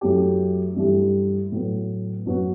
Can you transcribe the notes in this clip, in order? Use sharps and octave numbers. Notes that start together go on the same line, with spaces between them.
F#2 F#3 A3 E4 G4
G2 E3 A3 E4 G4
A2 F#3 B3
F#2 F#3 B3 F#4